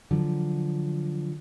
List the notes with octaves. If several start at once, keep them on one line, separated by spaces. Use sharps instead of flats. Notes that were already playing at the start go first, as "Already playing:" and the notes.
D3 F3 F#3